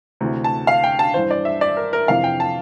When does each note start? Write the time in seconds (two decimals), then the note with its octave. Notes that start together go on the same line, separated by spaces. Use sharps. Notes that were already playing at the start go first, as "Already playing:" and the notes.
0.21 D2 C3 E3
0.44 A5
0.67 F5
0.84 G5
0.99 A5
1.14 G2 E3 C5
1.31 D5
1.45 E5
1.61 D5
1.77 A#4
1.93 A#4
2.08 F2 C3 E3 F5
2.24 G5
2.40 A5